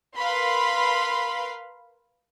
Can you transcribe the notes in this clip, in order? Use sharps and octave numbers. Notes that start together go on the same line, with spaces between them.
A#4 B4 F5 B5 C6